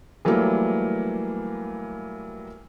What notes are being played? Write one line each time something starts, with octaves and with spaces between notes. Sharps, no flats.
E3 F#3 G3 A3 A#3